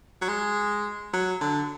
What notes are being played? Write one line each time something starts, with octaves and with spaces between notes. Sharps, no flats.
F#3
G#3
F#3
D3